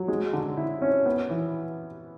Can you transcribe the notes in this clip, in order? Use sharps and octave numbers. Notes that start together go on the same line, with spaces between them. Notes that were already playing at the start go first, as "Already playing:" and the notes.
Already playing: F#3
G#3
D3
E4
C#4
B3
E3